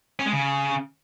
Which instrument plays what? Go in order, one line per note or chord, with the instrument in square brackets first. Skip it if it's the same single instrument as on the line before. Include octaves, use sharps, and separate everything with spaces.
[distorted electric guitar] C#4
G#3
C#3